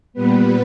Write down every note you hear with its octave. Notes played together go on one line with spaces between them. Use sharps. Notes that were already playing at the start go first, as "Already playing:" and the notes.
A#2 G3 B3 B4